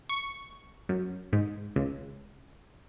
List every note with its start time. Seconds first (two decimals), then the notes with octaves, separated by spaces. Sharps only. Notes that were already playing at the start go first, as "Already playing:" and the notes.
0.09 C#6
0.89 F#2
1.33 G#2
1.76 C#2